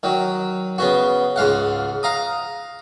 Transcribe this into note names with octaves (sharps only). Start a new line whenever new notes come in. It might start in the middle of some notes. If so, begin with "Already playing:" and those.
D#3 F#3
C#3 B3 F#4
C#2 G#2 F5 F#5
F5 A#5 D#6